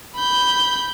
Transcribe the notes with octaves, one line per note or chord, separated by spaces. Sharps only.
B5 G6